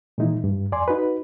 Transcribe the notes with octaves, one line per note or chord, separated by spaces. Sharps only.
A#2 D#3 E3 G#3 D#4 E4
G2
F2 D5 G#5 C6
D#4 F#4 B4